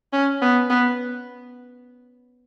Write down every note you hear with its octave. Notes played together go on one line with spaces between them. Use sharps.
C#4
B3
B3